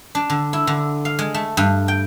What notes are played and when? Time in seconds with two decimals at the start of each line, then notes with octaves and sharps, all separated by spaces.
0.15 D4
0.30 D3
0.53 E4
0.67 D3
1.05 F5
1.19 G#3
1.34 A3
1.57 G2
1.88 G5